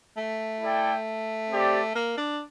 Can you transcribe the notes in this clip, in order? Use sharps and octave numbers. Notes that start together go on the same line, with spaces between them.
A3
E4 A4 D5 G5
C4 G4 D5
A#3
D4